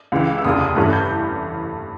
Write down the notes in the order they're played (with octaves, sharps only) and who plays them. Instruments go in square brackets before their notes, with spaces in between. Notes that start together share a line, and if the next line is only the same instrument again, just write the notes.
[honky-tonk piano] C#2 C#3 E3
E6
F1 D#2 C#3 D#6
D#6
G2 E3 A3 C#4 F#6
G6